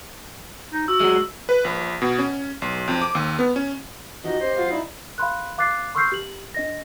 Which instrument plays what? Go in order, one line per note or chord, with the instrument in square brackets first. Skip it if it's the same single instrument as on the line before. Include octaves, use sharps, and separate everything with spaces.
[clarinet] D#4
[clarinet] F#4 [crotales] E6
[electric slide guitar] F#3 G#3
[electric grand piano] B4
A#1
B2
C#4
B1
F2
D6
D#2
B3
C#4
[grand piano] F3 D#4 [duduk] F#4 [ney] G4 [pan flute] D#5
[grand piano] C#4 [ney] G4 [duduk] C5
[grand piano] F#3 F4 F#4 [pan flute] F5
[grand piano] D#4 [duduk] E4 [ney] D5
[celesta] F5 B5 C6 F#6
F5 D6 F#6 A6 C7
C6 C#6 E6 F6 G6 C7
G4 F#7
D4 D#5 A#6